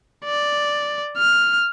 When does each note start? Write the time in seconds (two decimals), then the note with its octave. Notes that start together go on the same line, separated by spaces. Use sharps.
0.25 D5
1.17 F6